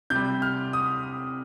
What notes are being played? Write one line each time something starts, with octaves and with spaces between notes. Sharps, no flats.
C3 G6
G3
F6
D#6